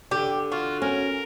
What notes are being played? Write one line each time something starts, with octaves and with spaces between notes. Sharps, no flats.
D3 G4
F4 F#4
C#4 A#4